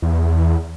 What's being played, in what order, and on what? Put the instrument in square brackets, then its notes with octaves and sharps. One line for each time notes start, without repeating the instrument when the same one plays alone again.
[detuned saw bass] E2